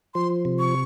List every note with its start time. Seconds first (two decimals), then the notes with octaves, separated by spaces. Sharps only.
0.14 F3 C6
0.45 C3
0.59 C#6